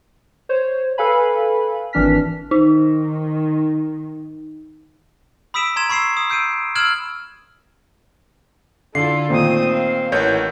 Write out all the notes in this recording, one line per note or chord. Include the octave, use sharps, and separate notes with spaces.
C5 C#5
A4 B4 F5 G#5 B5
G#1 E3 D4 F6 B6
D#3 D#4
B5 D#6 E6 B6 D7 E7
A#5 C6 G#6 E7
B5 C#6 E6 C7 E7
D#6
E6 G6 C7 D7 D#7
E6 F6 G#6 D7 E7 F#7
D3 E4 F4 A4 C7
A#2 D#3 A3 C4 D#6
F5
A1 E4 F#4 A#4 B4 C#5 G6